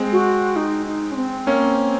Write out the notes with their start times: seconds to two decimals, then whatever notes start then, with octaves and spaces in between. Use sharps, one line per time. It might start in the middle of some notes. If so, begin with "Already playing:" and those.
Already playing: G#3 C4
0.12 F#4
0.56 D#4
0.86 D#4
1.11 C#4
1.16 C4
1.47 A#3 C#4